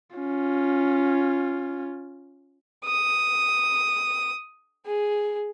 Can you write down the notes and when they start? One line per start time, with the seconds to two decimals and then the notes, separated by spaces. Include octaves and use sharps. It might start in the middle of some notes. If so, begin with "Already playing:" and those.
0.16 C#4 F4
2.85 D#6
4.86 G#4